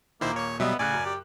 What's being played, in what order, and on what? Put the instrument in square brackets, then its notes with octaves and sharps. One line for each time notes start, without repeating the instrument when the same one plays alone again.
[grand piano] D#1 A#2 [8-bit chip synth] D#3 E4 C5 [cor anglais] A#3
[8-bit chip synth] C#5 C#6
[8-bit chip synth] B2 F#3 G3 [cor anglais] B3 [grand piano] D#5 E5
[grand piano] A2 C#3 F#6 [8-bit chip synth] D5 [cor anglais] G#5
[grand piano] F#2
[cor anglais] G4